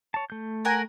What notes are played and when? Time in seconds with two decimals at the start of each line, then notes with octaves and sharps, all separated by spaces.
0.14 C#5 A5
0.30 A3 G6
0.65 A#4 F#5 G#5